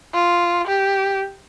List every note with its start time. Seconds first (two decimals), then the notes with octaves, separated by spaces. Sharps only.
0.14 F4
0.67 G4